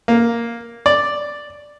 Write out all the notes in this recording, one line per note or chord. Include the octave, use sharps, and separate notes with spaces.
A#3
D5